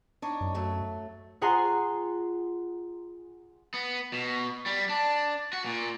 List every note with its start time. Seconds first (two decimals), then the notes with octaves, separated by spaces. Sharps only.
0.22 D4 D#4 C#5
0.41 F#2
0.54 F#3 A3
1.41 F4 G#4 F#5 G#5 A#5 C6
3.74 B3
4.13 B2
4.66 G3
4.89 D4
5.53 F#4
5.66 A#2